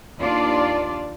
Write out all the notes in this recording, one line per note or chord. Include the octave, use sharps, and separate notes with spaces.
D#2 D4 F4 D5